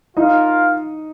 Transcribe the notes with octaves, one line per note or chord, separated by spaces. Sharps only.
D#4 F4 A#4 D#5 F5